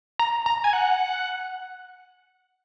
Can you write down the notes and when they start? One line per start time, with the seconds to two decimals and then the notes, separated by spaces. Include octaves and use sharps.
0.19 A#5
0.46 A#5
0.64 G#5
0.73 F#5